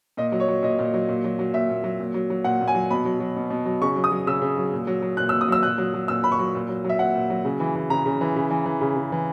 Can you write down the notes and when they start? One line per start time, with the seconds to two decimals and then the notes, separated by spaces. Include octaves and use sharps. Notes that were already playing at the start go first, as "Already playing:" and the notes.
0.17 A#2 D#5
0.32 F#3
0.40 C#5
0.48 F#3
0.63 A#2 D#5
0.79 A#2
0.94 F#3
1.09 A#2
1.24 F#3
1.39 F#3
1.54 A#2 E5
1.70 A#2
1.84 F#3
2.00 A#2
2.14 F#3
2.30 F#3
2.44 A#2 F#5
2.61 A#2
2.68 G#5
2.75 F#3
2.91 B2 B5
3.05 F#3
3.20 F#3
3.36 B2
3.50 B2
3.66 F#3
3.82 C#3 C#6
3.96 F#3
4.04 D#6
4.12 F#3
4.27 C#3 E6
4.42 C#3
4.58 F#3
4.73 A#2
4.87 F#3
5.02 F#3
5.17 A#2 F#6
5.29 E6
5.33 A#2
5.41 D#6
5.48 F#3 E6
5.63 A#2 F#6
5.78 F#3
5.94 F#3
6.08 A#2 E6
6.23 A#2 B5
6.32 C#6
6.39 F#3
6.55 A#2
6.69 F#3
6.85 F#3 E5
6.99 A#2 F#5
7.15 A#2
7.30 F#3
7.45 C#3
7.60 E3
7.76 E3
7.90 C#3 A#5
8.06 C#3
8.21 E3
8.36 C#3
8.51 E3
8.66 E3
8.81 C#3
8.96 C#3
9.12 E3